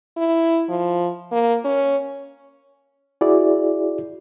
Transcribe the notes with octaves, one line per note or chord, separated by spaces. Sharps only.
E4
F3
A#3
C#4
E4 F#4 G#4 D5